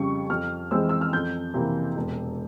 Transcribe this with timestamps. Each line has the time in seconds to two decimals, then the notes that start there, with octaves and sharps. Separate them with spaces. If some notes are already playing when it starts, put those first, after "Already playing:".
Already playing: F2 C#3 G3 C#6
0.30 F2 F6
0.71 E3 G#3 C4 E6
0.89 E6
1.01 F6
1.13 F2 G6
1.54 C3 E3 A#3
1.97 E1